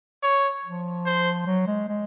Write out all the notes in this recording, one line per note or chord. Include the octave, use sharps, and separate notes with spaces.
C#5
F3
C5
F#3
G#3
G#3